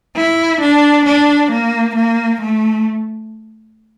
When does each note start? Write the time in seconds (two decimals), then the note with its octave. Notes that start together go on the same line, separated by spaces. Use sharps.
0.16 E4
0.61 D4
1.06 D4
1.52 A#3
1.96 A#3
2.41 A3